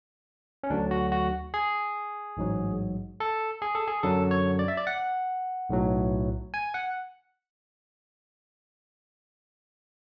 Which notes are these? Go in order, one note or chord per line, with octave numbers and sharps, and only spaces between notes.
C#4
D2 D3 F#3 D4
F#4
F#4
G#4
A1 G#2 F#3
A4
G#4
A4
G#4
F#2 D3 F#3 A4
C#5
D5
E5
D5
F#5
B1 A2 F#3
G#5
F#5